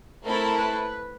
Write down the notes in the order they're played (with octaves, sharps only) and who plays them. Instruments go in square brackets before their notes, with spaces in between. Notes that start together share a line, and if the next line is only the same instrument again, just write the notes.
[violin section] A3 C4 E4 A4 [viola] A#4
[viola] B4